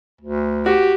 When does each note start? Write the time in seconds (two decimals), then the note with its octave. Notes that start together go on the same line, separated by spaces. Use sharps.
0.21 D2
0.66 F#4 G4